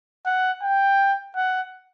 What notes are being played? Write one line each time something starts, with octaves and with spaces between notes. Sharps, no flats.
F#5
G5
F#5